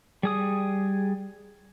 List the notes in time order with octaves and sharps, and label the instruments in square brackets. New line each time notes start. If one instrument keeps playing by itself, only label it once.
[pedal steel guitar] G3 G#4 D#6